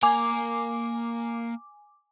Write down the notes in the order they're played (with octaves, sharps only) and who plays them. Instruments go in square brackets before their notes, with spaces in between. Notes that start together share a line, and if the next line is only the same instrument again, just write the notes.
[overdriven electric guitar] A#3 A#4 [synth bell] G#5 D6